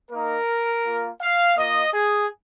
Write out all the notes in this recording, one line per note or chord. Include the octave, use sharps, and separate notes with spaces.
A#3 D#4 A#4
A#3 F4
F5
A#3 F4 D#5
G#4